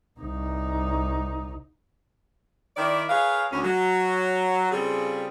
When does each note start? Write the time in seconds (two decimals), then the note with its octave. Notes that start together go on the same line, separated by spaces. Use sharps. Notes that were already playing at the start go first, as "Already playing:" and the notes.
0.20 C2 D#4
2.76 D#3 E4 D5
3.09 G#4 A#4 B4 C#5 F5
3.51 D2 C#4
3.64 F#3
4.72 C#3 G3 C4 F4 G#4 A4